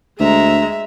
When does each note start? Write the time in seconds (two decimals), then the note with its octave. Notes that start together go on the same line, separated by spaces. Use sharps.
0.20 D2 G#3 E5 A#5